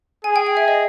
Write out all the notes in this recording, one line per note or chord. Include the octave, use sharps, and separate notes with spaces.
G#4 G#5
G5
G5
E5
D#5